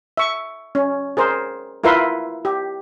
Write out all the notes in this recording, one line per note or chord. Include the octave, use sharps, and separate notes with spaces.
E5 C#6
C#4
G#4 A#4 C5
E4 F4 A#4 B4 E5 C6
G4